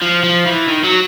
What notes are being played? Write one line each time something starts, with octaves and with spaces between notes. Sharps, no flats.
F3
F3
E3
D#3
F#3